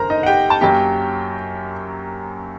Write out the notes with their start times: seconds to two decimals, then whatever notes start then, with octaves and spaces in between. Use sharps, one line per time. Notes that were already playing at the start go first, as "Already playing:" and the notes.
Already playing: F#1 F#2 D#3 G3 A#4 C5 A#5
0.10 D#4 D#5
0.23 F#5
0.26 G4 G5
0.50 A5
0.61 F#2 F#3 A#3 G4 G5